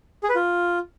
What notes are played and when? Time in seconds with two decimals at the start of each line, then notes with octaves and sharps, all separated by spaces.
0.23 G#4
0.29 B4
0.35 F4